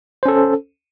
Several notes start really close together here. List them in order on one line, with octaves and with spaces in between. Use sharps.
C5 C#4 A4